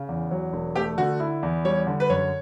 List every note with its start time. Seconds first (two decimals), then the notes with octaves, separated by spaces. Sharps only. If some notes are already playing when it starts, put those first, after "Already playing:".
Already playing: C#3
0.09 E2
0.31 F#3
0.53 E1
0.75 A3 G4
0.98 D3 F#4
1.20 E4
1.43 E2
1.65 G3 C#5
1.87 D3
2.00 B4
2.10 F#2 C#5